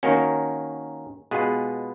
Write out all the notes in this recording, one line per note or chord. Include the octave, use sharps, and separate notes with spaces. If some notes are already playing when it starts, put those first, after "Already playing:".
D#3 A#3 C#4 F#4
B2 G#3 B3 F4 G#4